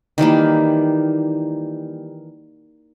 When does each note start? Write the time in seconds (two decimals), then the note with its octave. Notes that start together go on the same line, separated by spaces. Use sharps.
0.18 D#3 E3 G3 A#3